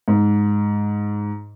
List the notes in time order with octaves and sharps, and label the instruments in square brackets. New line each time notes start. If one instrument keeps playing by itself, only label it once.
[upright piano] G#2